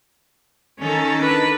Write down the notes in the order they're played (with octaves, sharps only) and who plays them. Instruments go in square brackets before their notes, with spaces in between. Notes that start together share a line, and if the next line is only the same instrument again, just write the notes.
[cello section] D#3 A4 [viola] C#4
[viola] D4 B4